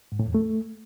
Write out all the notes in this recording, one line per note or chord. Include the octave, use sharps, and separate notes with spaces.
G#2
A2
E2
A3